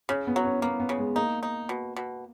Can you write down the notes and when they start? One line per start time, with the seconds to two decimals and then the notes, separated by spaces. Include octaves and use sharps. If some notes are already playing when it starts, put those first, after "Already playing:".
0.09 C#3 C#4
0.27 B3
0.36 F#3
0.45 C#4
0.62 A#3 B3
0.80 B3
0.89 C#3
0.99 G#3
1.15 A#3 D#4
1.43 D#4
1.69 B2
1.96 B2